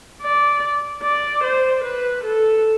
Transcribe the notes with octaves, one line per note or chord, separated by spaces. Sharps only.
D5
D5
C5
B4
A4